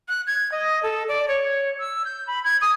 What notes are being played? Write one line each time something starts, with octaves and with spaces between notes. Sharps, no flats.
F#6
G#6
D#5
A4
D5
C#5
E6
G6
B5
G#6
D#6